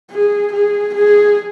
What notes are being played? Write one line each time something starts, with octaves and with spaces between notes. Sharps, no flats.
G#4
G#4
G#4